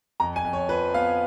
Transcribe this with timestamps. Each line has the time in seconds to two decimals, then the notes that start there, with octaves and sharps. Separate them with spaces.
0.20 F2 A#5
0.36 G#5
0.45 F2
0.53 C#5
0.69 F3 B4
0.94 B3 F5